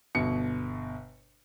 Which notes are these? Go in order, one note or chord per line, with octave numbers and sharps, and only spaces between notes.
G1 B2 C#7